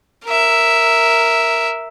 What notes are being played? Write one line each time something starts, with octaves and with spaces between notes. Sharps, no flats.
A#4 E5